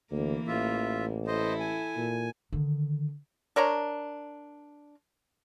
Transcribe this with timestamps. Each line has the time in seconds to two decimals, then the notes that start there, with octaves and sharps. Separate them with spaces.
0.12 D2 E3 A#3
0.48 A1 F4 E5
1.27 E4 A4 C5 D#5
1.60 G#5
1.97 A#2
2.53 D3 D#3
3.56 D4 A#4 C#5 A#5